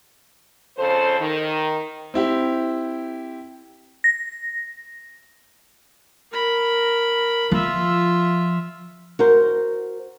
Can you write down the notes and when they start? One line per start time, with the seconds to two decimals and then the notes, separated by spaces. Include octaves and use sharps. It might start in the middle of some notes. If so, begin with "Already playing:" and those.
0.77 F2 C#3 A4 C5
1.20 D#3
2.14 C4 E4 G4
4.04 A#6
6.32 A#4 B5
7.52 F3 F4 E5
9.19 F#4 A#4 C5